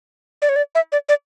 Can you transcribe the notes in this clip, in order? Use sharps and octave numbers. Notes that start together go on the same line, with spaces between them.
D5
C#5
D5
E5
D5
D5